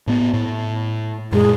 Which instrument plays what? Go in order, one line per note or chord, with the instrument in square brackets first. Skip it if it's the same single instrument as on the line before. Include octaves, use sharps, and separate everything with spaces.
[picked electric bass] A2 B3
A2
[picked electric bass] F#2 A#2 [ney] G#3